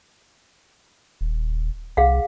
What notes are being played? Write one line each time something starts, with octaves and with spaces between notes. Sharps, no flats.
D#1
C2 G#4 F5 F#5